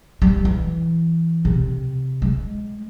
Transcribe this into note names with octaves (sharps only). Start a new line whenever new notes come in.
G3
E3
C3
G#3